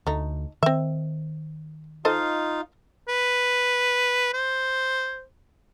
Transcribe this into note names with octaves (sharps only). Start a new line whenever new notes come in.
D2 A3 D#4
D#3 C4 E5
D#4 F4 A4 C5 D#5 F5
B4
C5